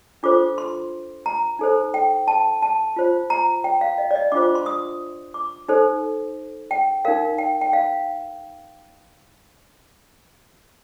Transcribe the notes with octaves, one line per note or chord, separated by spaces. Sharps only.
D4 F4 A4 C5 D6
C6
A#5
D#4 A4 C5
G5
A5
A5
F4 C5
A#5
G5
F5
D#5
D5
D#5
D4 F4 C5 D6
D6
C6
D#6
D6
D#4 A4 C5
G5
D#4 A#4 F5
G5
G5
F5